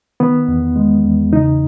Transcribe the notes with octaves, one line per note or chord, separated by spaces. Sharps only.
D#3 B3
E2
G#3
E2
C#3 D#4